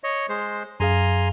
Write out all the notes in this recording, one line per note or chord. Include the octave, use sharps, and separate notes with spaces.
C#5 D#5
G#3 C5
F#2 G#4 F5 G#5 A#5 C6